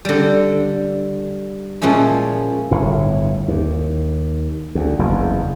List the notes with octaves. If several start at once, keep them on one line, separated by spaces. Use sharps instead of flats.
D3 G3
A#2 F3 G#3 C#4 E4
G1 A2
D#2
D2
F#1 E2